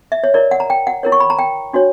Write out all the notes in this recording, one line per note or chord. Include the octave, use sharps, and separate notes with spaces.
E5
C#5
E4 A#4 C#5 D5
F#5
A#5
G5
F#5
E4 A#4 C#5
C#6
B5
A#5
G5
D4 F#4 C#5